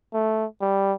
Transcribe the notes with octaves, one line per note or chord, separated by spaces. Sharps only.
A3
G3